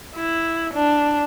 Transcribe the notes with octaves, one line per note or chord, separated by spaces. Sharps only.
E4
D4